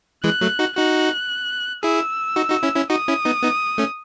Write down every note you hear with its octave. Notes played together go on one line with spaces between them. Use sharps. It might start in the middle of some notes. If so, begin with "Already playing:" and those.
E3 G#3 F#6
F#3 A3
D#4 F#4
D#4 F#4 F#6
E4 G#4 E6
D#4 F#4
D#4 F#4
C#4 E4
C#4 E4
D#4 F#4 D#6
C#4 E4
B3 D#4
B3 D#4
A3 C#4